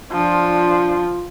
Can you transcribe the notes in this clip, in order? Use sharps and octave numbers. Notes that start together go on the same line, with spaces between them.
F3 D4 F4